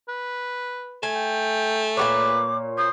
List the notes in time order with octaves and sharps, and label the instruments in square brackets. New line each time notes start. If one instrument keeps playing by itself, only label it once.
[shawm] B4
[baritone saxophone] A3 [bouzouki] G#5
[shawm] G5
[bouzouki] A#2 G3 C#5 [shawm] B4 [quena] D6
[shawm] C5 [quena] D#6